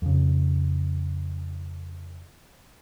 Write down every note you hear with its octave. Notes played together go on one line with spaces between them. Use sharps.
F2 C#3